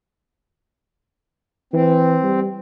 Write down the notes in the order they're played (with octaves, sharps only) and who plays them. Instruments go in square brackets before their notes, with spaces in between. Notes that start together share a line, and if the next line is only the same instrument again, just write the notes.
[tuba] E3 [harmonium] C4
[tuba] G3